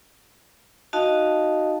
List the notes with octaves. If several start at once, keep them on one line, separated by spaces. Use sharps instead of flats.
D#4 F#4 D#5 F5 A5